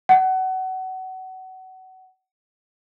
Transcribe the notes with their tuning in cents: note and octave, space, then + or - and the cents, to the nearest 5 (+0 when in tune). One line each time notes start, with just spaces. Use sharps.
F#5 +25